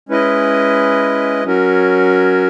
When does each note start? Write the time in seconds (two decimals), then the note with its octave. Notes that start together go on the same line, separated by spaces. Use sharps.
0.09 G#3 C#4 E4 B4 D#5
1.44 F#3 C#4 F#4 A#4